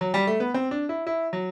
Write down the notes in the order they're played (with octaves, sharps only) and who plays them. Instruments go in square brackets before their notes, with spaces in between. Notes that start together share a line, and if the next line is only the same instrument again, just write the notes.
[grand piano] F#3
G3
A3
B3
C4
D4
E4
E4
F#3